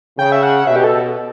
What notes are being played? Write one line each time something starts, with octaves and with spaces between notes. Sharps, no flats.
C#3 G5
E5
F#5
B2 E5
G4
A4